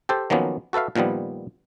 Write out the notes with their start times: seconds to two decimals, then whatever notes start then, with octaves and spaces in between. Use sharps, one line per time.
0.09 G4 A4 C5
0.30 D#3 F3 F#3 A#3 B3 C#4
0.73 F#4 A4 B4 E5 F5
0.96 A#2 D#3 F3 G3 B3